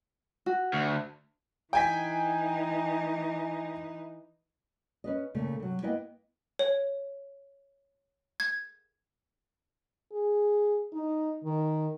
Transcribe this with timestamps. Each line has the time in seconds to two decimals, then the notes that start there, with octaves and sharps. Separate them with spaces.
0.46 F#4
0.73 D2
1.73 E3 D#4 G5 G#5 B6
5.04 C#4 B4 D#5
5.35 A#2 C#3 A3
5.60 C3 F#3
5.82 A#3 B3 E4 B4 D#5 G5
6.59 C#5
8.40 G#6
10.12 G#4
10.93 D#4
11.44 D#3